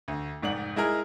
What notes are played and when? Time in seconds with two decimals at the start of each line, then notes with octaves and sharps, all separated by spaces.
0.08 D2
0.42 F1 G#2 D5 F#5 F#7
0.76 G#3 E4 G#4 A#4